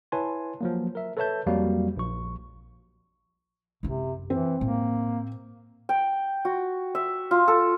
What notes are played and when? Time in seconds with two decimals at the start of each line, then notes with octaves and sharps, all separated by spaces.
0.12 E4 B4 C#5 G#5 A5 C6
0.61 F3 F#3 A#3
0.95 A#4 E5
1.17 A4 B4 C#5 E5 A5 G6
1.46 F2 F#3 G3 A#3 F#4 F5
1.97 A#1 C#6
3.83 F#2 C3 E4
4.30 E3 C4
4.61 A2 A#3
5.89 G5
6.45 F#4
6.95 E5
7.31 F4
7.48 A4